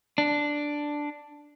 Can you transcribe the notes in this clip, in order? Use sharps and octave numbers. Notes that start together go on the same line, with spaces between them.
D4